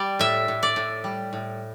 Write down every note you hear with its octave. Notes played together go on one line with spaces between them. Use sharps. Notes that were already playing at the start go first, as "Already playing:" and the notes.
Already playing: G3 D5
A2 E5
A2
D5
A2
G3
A2